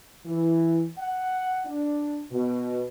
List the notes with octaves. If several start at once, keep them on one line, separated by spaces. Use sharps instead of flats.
E3
F#5
D4
B2